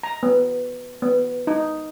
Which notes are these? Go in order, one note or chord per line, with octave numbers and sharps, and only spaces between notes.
A#5
B3
B3
D#4